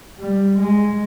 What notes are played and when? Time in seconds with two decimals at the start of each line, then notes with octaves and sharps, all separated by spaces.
0.20 G3
0.60 G#3